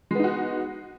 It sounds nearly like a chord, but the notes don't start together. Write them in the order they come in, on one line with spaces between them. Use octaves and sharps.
G#3 B3 D#4 F#4